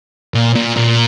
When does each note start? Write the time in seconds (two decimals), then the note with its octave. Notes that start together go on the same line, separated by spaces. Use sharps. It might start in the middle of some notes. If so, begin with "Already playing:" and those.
0.34 A#2
0.55 A#2
0.76 A#2